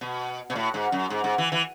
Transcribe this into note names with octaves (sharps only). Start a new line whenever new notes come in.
B2
B2
A2
G#2
F#2
G#2
G#2
E3
E3